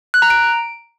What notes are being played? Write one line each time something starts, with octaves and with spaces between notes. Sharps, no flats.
F#6
A#5
D7